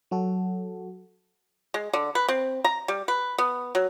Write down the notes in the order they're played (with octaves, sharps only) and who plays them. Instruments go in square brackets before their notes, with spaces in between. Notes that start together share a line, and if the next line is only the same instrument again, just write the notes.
[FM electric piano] F#3 F#4 A4
[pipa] G#3
D3
B4
C4
A#5
G3
B4
B3
F#3